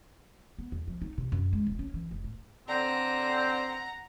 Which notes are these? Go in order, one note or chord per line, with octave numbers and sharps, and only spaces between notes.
B3
E2
F3
D#4
C3
F#2
G#3
D#1
C#4
E3
F1
A2
D3 C4 F#5 A#5